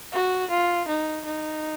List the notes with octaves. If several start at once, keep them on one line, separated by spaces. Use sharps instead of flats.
F#4
F4
D#4
D#4